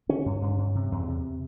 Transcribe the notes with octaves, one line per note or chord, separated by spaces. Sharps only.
D3 C#4
G2
G2
G2
C3
E2
C3